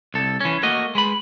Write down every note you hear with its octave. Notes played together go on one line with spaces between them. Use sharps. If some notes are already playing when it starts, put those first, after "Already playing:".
C2 A4
E3 C#4
A3 A#3 F#4 D#5
G#3 B4 B5